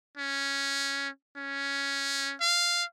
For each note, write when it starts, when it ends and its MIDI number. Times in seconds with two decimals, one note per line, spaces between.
0.17 1.09 61
1.37 2.34 61
2.40 2.84 77